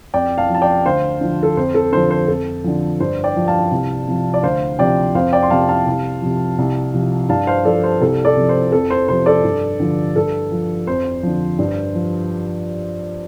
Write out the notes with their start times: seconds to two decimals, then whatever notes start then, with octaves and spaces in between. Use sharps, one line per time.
0.14 F2 D5 G5
0.38 F5 A5
0.49 F3
0.55 A5
0.62 D5 G5
0.85 D2 C5 F5
1.21 D3 F3
1.43 A4
1.57 F2 C5
1.75 A4
1.92 D3 F3 C5
2.11 C5
2.28 F2 A4
2.64 D3 F3
3.00 G2 C5
3.24 D5 G5
3.36 F3
3.48 F5 A5
3.71 C2
4.07 C3 F3
4.34 D5
4.43 D2 C5 F5
4.79 C3 F3 D5 G5
5.15 F2 C5 F5
5.33 D5 G5
5.43 C6
5.50 C3 F3 F5 A5
5.69 F5 A5
5.87 C2
6.22 C3 F3
6.58 C2
6.94 C3 F3
7.29 G2 F5 A5
7.47 C5 F5
7.65 F3 A4 D5
7.83 C5
8.01 C2 A4
8.25 A4 D5
8.37 C3 F3
8.49 C5
8.72 F2 A4
8.90 C5
9.08 C3 F3 C5
9.26 A4 D5
9.44 G2
9.80 D3 F3
10.16 G2 A4
10.52 F3
10.87 F2 C5
11.23 D3 F3
11.59 G2
11.95 F3